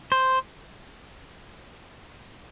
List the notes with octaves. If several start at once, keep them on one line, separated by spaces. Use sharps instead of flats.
C5